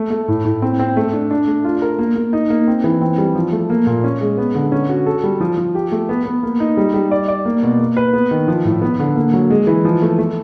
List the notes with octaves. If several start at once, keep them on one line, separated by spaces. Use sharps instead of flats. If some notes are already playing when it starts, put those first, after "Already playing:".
Already playing: A3
A3
A2
A2
C4
C4
A3
D4
D4
A3
F4
A#4
A#3
A#3
D#4
A#3
C4
E3
C4
G3
F3
A3
A#3
A#2
C#4
G#3
B3
D3
C#4
F#4
A4
G3
F3
F3
G4
A3
B3
B3
A#3
D#4
G3
G3
D5
D5
A#3
B2
A#3
B4
B3
D#3
F3
A2
B3
D3
A#3
F#3
G#3
E3
F3
A3
A3